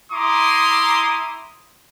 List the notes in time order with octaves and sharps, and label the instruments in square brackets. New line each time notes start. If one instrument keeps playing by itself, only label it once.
[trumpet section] E4 A#5 C6 D6 D#6